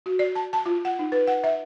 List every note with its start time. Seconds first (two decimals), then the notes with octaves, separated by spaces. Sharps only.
0.06 F#4
0.19 D5
0.35 A5
0.53 A5
0.66 F4
0.85 F#5
0.99 D#4
1.12 B4
1.27 F#5
1.44 E5